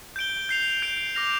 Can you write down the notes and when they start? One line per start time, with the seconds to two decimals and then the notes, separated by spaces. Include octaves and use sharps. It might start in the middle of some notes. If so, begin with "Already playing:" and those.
0.16 G6 D7 G7
0.49 G6 C7 F7
0.82 G6 D7 F7
1.15 D6 F6 A#6 F7